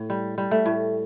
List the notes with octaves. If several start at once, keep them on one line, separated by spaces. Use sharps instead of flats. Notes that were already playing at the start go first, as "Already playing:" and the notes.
Already playing: A2
G3
G3
A3
A2